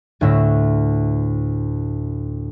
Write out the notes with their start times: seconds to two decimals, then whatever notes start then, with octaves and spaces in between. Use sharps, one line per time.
0.21 D2 A2 E5 A#6